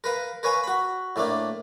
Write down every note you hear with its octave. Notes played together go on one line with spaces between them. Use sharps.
A#4 B4 F5
A#4 B4 C#5 F5 G#5
F#4 B5
A2 A3 A#3 D4